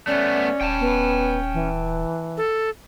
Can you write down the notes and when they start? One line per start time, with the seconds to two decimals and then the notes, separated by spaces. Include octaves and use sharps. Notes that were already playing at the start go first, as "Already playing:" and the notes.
0.07 A3 B3 C#4 D5
0.61 D#1 G5 A5
0.80 B3
1.54 E3
2.37 A4